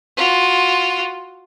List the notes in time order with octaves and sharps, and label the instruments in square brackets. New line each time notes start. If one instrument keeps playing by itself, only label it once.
[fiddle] F4 F#4